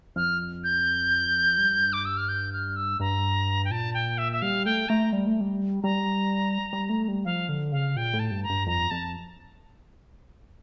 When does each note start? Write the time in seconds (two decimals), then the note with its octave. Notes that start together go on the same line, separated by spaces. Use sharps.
0.16 F2 F6
0.64 G6
1.58 G2
1.93 D6
2.05 E6
2.17 F6
2.29 G6
2.53 F6
2.76 E6
3.00 G2 A#5
3.65 G5
3.71 A#2 A5
3.94 G5
4.18 E5
4.32 E5
4.42 G3 F5
4.65 A3 G5
4.89 A3 A#5
5.13 G3
5.27 A3
5.41 G3
5.83 G3 A#5
6.73 G3
6.89 A3
7.08 G3
7.25 F3 F5
7.49 D3
7.72 C#3 F5
7.96 A#2 G5
8.13 A2
8.19 A5
8.31 G2
8.43 A#5
8.50 G2
8.67 F2 A#5
8.91 F2 A5